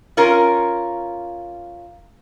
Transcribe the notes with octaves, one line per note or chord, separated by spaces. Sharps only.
C#4 F4 A#4